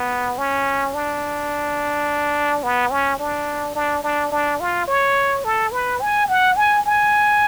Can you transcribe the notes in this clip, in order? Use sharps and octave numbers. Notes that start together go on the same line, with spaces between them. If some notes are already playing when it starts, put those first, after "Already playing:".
Already playing: B3
C#4
D4
B3
C#4
D4
D4
D4
D4
F4
C#5
A4
B4
G#5
F#5
G#5
G#5